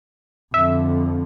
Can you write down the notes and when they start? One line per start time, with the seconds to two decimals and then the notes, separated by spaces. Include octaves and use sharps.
0.54 F2 D3 E5